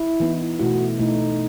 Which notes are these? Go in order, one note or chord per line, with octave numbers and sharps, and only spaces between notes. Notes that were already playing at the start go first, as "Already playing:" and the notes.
Already playing: E4
E3 B3 D#4
B2 A3 E4 F#4
B2 A3 D#4 E4